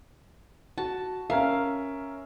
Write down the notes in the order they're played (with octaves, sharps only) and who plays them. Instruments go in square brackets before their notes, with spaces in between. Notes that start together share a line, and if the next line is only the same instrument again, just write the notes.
[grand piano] F#4 [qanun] A5
[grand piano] C#4 A#4 E5 [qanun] F5